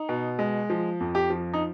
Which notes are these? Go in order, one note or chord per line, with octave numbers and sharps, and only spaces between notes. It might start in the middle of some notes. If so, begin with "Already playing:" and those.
Already playing: D#4
B2
G#3
F3
F2
G4
F3
D#4